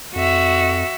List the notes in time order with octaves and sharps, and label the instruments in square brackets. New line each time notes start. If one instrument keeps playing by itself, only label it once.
[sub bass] F2 [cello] F#4 E5